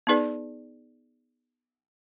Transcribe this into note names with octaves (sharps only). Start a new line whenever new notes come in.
B3 D#4 G#4 B4 D5